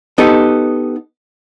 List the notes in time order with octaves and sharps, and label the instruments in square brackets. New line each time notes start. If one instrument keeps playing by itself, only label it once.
[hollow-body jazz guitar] B3 D#4 G4 A4